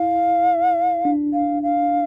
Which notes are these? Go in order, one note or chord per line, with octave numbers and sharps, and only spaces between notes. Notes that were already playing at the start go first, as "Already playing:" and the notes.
Already playing: E4 F5
D4
F5
F5